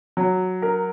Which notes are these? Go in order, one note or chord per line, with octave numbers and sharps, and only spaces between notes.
F#3
A#4